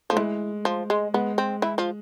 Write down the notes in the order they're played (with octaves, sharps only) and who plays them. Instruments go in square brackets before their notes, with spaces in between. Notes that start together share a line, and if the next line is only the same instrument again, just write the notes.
[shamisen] F3 [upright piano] A3
[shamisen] E3 [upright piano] G#3
[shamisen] F3
G#3
[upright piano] G#3 [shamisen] B3
[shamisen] C4
E3 E4
F3 F4